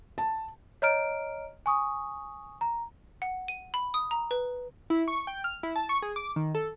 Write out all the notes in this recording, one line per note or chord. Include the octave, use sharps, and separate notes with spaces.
A5
C#5 D#5 A#5 F6 D7
G#5 C#6 D#6
A#5
F#5
D#7
B5
D#6
A#5
B4
E4
C#6
G5
F6
E4
A5
C#6
G#4
D6
D#3
A4